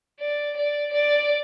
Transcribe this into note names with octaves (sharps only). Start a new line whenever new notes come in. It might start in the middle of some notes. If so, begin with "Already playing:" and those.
D5
D5
D5